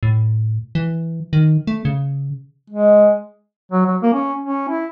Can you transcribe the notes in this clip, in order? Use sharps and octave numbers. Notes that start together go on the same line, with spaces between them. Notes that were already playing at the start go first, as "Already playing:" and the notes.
A2
E3
D#3
A3
C#3
G#3
F#3
F#3
A#3
C#4
C#4
E4